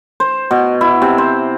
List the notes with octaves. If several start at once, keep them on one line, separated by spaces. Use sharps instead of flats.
C5
B2
E4
C3
C5